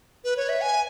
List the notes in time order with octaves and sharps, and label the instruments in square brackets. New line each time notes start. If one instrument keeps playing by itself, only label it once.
[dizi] B4
C#5
E5
G#5